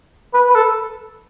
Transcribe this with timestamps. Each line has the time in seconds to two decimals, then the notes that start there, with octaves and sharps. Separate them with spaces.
0.34 B4
0.49 B4
0.55 A4